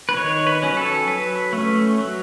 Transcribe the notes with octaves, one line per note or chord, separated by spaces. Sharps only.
B4
D#3 C#5
B4
F#3 C#4
A4
F#3 B4
A3 C#4
F#3